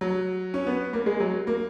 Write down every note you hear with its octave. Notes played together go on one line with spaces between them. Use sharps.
F#3
C#4
B3
A#3
G#3
F#3
A#3